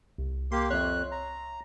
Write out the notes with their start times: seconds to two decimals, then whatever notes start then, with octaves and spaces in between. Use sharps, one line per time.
0.18 C2
0.52 A#3 G4 C6
0.70 F2 C#5 E5 F#6
1.12 A#5